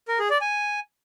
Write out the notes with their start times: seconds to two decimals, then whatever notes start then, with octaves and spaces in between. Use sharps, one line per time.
0.08 A#4
0.19 G#4
0.30 D5
0.41 G#5